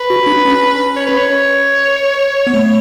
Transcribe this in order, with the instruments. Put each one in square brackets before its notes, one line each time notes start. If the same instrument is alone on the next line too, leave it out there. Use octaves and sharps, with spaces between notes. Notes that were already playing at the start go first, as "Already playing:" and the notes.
Already playing: [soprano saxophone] B4
[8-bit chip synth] F#4
D4
C#4
[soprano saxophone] C#5
B4
C#5
[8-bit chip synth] B3
A3